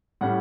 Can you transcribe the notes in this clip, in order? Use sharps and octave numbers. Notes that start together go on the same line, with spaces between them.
A2 G3 C#4 F#5